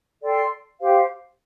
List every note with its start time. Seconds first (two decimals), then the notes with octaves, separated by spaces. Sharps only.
0.22 A4 D5 G5 C6
0.79 G4 C5 F5